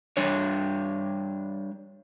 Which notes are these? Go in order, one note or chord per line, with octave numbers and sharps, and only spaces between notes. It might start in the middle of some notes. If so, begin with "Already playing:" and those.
G3 D4 C#5